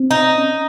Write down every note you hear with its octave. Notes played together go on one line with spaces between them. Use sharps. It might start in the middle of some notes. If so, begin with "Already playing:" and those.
Already playing: C4
D#4
C#4